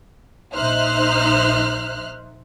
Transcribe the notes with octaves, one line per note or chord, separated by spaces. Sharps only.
A#1 D#4 C5 E5 F6 F#6